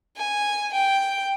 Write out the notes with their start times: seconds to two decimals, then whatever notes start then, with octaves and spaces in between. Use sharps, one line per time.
0.17 G#5
0.73 G5